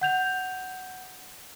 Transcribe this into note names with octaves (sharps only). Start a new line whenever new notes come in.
F#5 G6 F7